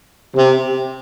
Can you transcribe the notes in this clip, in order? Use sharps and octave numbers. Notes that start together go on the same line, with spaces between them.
C3